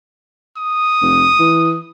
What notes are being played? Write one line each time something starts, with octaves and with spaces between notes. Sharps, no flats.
D#6
F1
E3